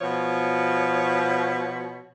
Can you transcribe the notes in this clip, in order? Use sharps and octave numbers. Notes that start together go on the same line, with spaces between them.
B2 F3 C#5